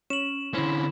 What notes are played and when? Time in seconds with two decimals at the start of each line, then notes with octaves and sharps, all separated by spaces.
0.10 C#4 E7 F#7
0.54 D3 C4 C#4 E4